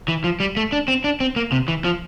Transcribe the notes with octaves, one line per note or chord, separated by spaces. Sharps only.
E3
F3
G3
A3
D4
C4
D4
C4
A#3
C3
E3
F3